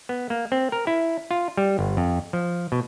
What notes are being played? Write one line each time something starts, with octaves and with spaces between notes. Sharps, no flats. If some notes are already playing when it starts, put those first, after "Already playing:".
B3
A#3
C4
A#4
E4
F4
G3
G1
F2
F3
B2